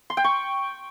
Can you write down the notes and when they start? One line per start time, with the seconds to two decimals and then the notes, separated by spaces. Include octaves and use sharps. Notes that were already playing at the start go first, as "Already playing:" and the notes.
0.10 C6
0.17 G5
0.24 C#6